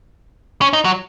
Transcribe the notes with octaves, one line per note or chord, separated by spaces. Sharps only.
C#4
D#4
F#3